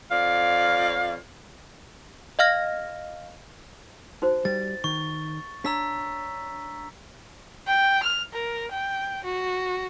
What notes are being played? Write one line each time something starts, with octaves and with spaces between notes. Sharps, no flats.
F2 D5 F5
D#5 F5 F6 A#6
D#4 F#4 C5
G3 A6
D#3 C#6
D4 C#5 A5 A#5 E6 B6
G5
F6
A#4
G5
F#4